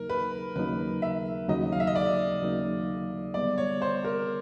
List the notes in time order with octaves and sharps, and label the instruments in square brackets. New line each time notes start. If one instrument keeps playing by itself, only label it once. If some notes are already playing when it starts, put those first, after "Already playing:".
Already playing: [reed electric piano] D#2 C#3 F#3 A#3 D#4 [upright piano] A#4
[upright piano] B4
[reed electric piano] D#2 C#3 F#3 A#3 D#4 [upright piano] B4
[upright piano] E5
[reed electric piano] D#2 C#3 F#3 A#3 D#4 [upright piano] D#5
[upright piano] F5
E5
D#5
D5
[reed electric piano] D#2 C#3 F#3 A#3 D#4
[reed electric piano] D2 D3 G3 B3 [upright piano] D5
[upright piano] C#5
C5
A#4